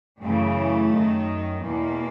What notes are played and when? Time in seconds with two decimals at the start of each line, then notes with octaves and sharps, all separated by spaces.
0.22 F#2 C#3 E3 A3
0.93 F#2 D#3
1.64 E2 B2 A#3